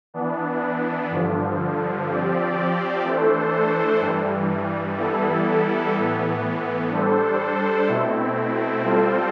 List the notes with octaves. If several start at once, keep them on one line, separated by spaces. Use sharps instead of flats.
E3 B3 D4
G2 D3 F3
F3 C4 G4 D5
E3 A3 D4 A4 C5
G2 E3 G3
E3 G3 B3 E4 A4
A2 E3 B3
G3 D4 A4 C5
B2 A3 C4 E4
G3 C4 F4 A4 C5